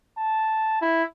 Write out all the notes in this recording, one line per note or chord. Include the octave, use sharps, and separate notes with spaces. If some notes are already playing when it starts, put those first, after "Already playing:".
A5
E4